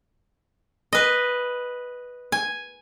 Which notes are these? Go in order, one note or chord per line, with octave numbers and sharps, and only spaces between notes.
B4 D#5
G#5